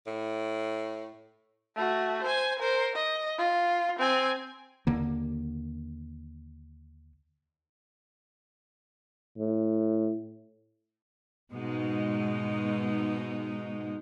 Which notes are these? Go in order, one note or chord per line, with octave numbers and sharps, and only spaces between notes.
A2
A3 F#4
C5 G#5
A#4 C5
D#5
F4
C4 G#5
D#2 D3 A#3
A2
G#2 B2 G#3 D#4